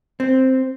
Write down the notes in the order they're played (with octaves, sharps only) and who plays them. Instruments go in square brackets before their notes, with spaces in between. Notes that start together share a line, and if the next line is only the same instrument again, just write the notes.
[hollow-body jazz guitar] C4